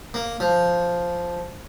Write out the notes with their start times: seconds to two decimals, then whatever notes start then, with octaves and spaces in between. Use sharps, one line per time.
0.14 A#3
0.40 F3